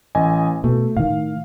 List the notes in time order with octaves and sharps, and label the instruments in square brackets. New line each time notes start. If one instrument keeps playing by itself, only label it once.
[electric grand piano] A1 D#5 G#5
[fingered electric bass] B2 [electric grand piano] A3
[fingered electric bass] A2 D#3 [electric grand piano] F5